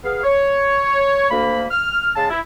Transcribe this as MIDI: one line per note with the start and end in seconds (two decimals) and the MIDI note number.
0.04 0.21 59
0.04 0.21 68
0.04 0.21 77
0.23 1.28 73
1.31 1.65 38
1.31 1.65 58
1.31 1.65 83
1.70 2.10 89
2.15 2.27 49
2.15 2.27 56
2.15 2.27 77
2.15 2.27 81
2.30 2.39 64